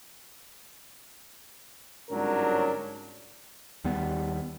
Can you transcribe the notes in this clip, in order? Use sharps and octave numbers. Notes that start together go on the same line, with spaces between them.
G1 G#2 F#3 C#4 D4 A#4
D#2 G3 B3